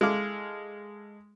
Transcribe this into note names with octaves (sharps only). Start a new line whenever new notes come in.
G#3 E4 A4 F5 D6 F6